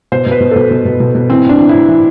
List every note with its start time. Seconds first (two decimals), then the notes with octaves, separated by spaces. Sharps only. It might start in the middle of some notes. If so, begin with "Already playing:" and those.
0.12 B2 C5
0.26 B2
0.31 B4
0.40 B2
0.51 B2 A4
0.71 B2
0.85 B2
1.00 B2
1.15 B2
1.29 E3 C4
1.44 A2 D4
1.60 E3
1.69 A2 E4
1.88 E3